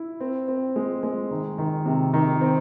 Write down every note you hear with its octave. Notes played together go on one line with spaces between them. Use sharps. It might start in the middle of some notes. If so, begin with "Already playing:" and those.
Already playing: E4
C4
C4
G#3
G#3
D#3
D#3
C3
D#3
C4